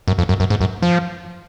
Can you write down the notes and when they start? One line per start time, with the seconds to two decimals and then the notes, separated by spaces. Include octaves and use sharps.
0.08 F#2
0.18 F2
0.29 F#2
0.40 F#2
0.50 G#2
0.61 F#2
0.82 F3